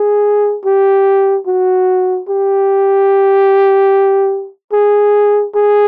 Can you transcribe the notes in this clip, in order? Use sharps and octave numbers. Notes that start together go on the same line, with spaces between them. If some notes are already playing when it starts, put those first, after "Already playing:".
Already playing: G#4
G4
F#4
G4
G#4
G#4